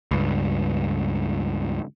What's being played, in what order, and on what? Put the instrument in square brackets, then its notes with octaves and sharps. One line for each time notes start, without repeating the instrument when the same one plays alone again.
[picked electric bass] C#2 G2